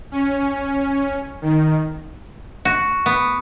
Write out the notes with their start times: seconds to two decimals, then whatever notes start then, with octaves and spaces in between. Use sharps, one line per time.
0.12 C#4
1.42 D#3
2.65 F#4
3.06 B3